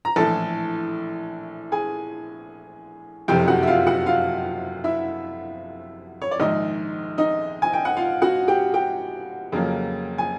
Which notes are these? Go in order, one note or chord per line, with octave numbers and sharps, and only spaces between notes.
A#5
A#1 A2 E3 A4 A5
G#4 G#5
F#1 F2 C3 F3 G4 G5
F#4 F#5
E5
F4 F5
F#4 F#5
F4 F5
E4 E5
C#5
D5
A#1 G#2 D#3 D#4 D#5
D#4 D#5
G#5
G5
F#5
F4 F5
F#4 F#5
G4 G5
G4 G5
F2 C#3 F#3 A#3
G#5